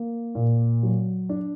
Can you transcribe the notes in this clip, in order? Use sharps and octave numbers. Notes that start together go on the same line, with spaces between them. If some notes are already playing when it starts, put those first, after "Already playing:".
Already playing: A#3
A#2
F#3
D4